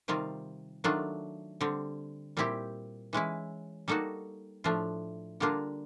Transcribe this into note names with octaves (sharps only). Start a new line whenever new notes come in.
C3 D#3 G3 C4 F4
D#3 F#3 A3 D4 F4
D3 G3 C4
A#2 G3 C4 E4 G4
E3 G#3 C#4 E4
G3 A#3 D#4 F#4 A4
A2 F3 A3 D4 F4
D3 G3 A#3 D4 F4